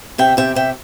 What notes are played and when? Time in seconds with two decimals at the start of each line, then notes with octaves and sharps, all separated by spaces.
0.18 C3 E5 G5
0.37 C3 E5 G5
0.55 C3 E5 G5